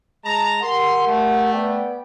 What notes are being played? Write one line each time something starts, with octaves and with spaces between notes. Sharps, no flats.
G#3 A5 A#5
G4 A#4 F#5 C6
A3
B3 D5 G5